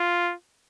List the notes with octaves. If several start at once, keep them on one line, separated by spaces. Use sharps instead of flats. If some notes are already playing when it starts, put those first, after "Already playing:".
Already playing: F4